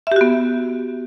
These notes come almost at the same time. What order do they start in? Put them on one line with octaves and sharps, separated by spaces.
E5 G4 F#4 B3